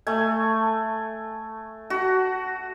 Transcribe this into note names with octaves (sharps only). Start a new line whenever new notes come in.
A3 G#5
F#4